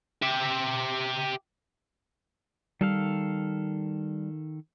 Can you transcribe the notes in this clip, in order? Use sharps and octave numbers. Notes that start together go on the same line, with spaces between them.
G4 E5
D#3 G3 A4 F5